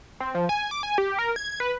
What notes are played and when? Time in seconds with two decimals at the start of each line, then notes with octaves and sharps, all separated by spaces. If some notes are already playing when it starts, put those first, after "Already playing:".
0.20 C4
0.35 F3
0.49 G#5
0.71 D6
0.83 G#5
0.98 G4
1.19 A#4
1.36 G#6
1.60 B4